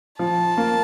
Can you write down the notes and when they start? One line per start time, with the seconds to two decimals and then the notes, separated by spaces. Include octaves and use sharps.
0.19 F3 A5
0.57 A#3